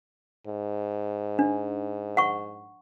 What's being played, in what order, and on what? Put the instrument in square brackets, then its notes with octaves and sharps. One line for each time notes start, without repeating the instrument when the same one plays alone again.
[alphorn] G#2
[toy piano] D4
F#5 C#6